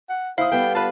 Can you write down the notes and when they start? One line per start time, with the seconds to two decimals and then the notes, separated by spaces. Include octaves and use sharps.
0.09 F#5
0.38 E4 C5 F5 D#6
0.52 G3 B3 A4 G5
0.75 F4 B4 A5